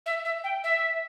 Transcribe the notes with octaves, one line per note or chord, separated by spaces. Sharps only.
E5
E5
G5
E5